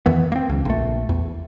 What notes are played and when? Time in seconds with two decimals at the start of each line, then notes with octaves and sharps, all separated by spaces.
0.06 E2 D#3 E3 B3
0.32 A#3 C4
0.49 C#2
0.65 A#1 A3
1.09 E2